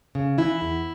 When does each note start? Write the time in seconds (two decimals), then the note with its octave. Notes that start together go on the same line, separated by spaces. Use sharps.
0.15 C#3
0.38 E3 E4
0.61 E2